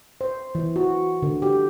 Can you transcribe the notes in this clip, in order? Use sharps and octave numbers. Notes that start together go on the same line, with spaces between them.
C5
E3
F#4
D3
G4